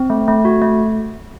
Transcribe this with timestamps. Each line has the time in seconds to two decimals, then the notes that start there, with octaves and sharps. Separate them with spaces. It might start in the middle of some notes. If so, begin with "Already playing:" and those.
Already playing: C4
0.10 A3
0.28 A3
0.45 F#4
0.62 A3